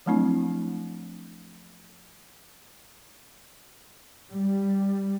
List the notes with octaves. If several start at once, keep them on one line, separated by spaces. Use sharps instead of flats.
F3 F#3 A3 C4 D4 E4
G3